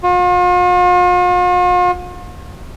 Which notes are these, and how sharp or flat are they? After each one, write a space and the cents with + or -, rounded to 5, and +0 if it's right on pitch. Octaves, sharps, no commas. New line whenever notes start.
F4 +45